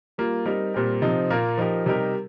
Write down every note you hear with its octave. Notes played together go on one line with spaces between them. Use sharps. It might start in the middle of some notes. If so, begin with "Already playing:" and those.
G3 A#3 F4
G3 C4 D#4 A#4
A#2 G3 C4 G4 A#4
C3 F3 C4 D#4
A#2 A#3 F4 A#4
F3 D#4 G4 A#4
C3 G3 D#4 G4 A#4